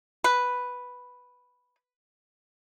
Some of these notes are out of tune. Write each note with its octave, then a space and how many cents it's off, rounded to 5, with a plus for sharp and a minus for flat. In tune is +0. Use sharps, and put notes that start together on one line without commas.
B4 +0